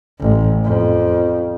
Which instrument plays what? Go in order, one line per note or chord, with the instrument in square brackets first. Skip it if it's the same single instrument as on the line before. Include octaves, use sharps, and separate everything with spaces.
[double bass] A1
F2